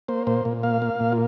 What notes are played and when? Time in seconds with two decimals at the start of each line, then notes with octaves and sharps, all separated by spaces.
0.08 A#3 C5
0.27 A#2 C5
0.45 A#2
0.63 A#3 F5
0.82 A#3
1.00 A#2
1.12 F4